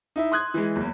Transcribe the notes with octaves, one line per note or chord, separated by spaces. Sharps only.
D#4 E4 E5
C6 D#6 F#6 G#6
E3 G#3
F#1 E2